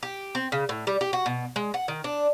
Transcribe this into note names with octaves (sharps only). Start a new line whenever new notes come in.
G4
C4
C#3
A2
G3
G4
F#4
B2
G#3
F#5
D#3
D4